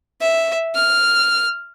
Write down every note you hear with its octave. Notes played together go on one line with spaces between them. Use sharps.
E5
F6